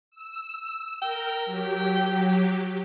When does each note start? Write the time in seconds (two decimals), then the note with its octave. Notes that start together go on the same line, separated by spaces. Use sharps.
0.11 E6
1.02 A#4 G5
1.46 F#3 G4